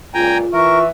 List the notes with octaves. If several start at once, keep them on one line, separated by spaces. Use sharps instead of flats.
C#2 A#2 F4 G5 G#5 A#5
E3 A#4 E5 C#6